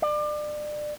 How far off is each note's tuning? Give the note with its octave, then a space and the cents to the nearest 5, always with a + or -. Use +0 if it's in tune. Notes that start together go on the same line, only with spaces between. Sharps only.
D5 +30